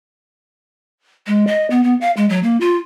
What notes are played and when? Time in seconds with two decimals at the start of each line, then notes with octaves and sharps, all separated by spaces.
1.27 G#3
1.47 D#5
1.70 B3
1.84 B3
2.01 F5
2.17 G#3
2.29 F#3
2.43 A#3
2.61 F4